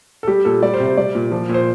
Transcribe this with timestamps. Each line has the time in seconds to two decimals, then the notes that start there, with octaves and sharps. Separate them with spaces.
0.23 A4
0.27 G3 G4
0.45 A#2 A4
0.62 G3 D5
0.74 C5
0.80 C3
0.85 C5
0.97 G3 D5
1.15 A#2
1.31 F3
1.49 A#2 C5